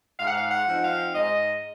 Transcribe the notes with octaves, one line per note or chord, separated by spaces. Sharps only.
G#2 F5
F#5
F5
F#5
F3 C4 D#4
F5
G#2 D#5